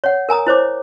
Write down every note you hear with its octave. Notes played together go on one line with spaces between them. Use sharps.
C#5 F#5
A#4 G#5 A#5 D#6
E4 C5 C#5 D6